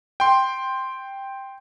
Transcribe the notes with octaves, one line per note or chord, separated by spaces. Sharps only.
G5 C6